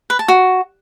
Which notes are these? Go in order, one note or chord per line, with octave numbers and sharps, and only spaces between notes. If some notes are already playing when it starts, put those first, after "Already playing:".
B4
A5
F#4